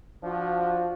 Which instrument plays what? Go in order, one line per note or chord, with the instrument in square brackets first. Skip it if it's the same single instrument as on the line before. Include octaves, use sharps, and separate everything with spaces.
[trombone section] F3 D4 F#4